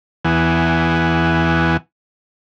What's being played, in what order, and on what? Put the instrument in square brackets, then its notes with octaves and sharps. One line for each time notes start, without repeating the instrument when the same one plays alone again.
[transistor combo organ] E2 E3 B3 F#5 G#5